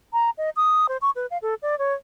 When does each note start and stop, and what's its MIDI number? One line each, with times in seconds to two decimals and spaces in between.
0.13 0.30 82
0.38 0.50 75
0.56 0.87 87
0.89 0.97 72
1.02 1.10 85
1.16 1.26 71
1.31 1.38 77
1.42 1.54 69
1.62 1.78 74
1.79 1.94 73